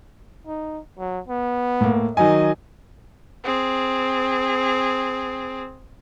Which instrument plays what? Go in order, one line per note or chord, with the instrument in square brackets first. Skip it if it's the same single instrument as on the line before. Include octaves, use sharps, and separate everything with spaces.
[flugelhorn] D#4
F#3
B3
[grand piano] A2 A#3
[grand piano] D#3 F#3 G#5 [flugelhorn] D#5
[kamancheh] C4 G#4